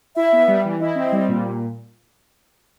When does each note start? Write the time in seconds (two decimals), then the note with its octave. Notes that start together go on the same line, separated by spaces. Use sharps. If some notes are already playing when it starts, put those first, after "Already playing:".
0.16 E4 E5
0.33 B3
0.48 G3
0.65 E3
0.80 E4 D#5
0.95 C4
1.12 G3
1.29 A#2